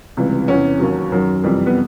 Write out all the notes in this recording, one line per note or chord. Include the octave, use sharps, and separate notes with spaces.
C#2 C3 E3 G3
E2 C3 E3 C#4
D#2 D#3 F#3
F#2 D#3 F#3
F2 C3 E3 G3
B3